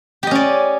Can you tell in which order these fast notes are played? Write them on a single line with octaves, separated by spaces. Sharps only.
G4 D#5 C#4 D5